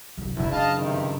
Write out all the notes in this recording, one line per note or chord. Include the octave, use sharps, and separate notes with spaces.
C2 F#2
F#1 G2 D3 E4
D4 D#5 F5 A5
G2 C3 D#3